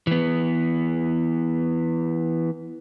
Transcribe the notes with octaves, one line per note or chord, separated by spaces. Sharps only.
E3 B3